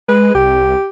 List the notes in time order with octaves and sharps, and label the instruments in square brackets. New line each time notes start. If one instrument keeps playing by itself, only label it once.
[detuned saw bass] G#3 [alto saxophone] B4
[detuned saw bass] C2 [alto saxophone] G4